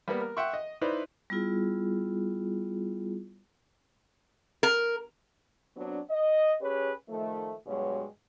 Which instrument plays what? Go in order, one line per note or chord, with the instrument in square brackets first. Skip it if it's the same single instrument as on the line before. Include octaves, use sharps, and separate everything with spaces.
[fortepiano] G3 A#3 B3
A#4
E5 F#5 G5 C6 C#6
D#5
D#4 E4 B4 C5 D5
[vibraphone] G3 B3 E4 F4 G#4
[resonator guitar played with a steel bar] A#4
[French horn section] F#3 B3 C4 D4
D#5
C#4 G4 G#4 B4 C#5
D#3 F3 A3
G2 B2 F#3 G#3 C#5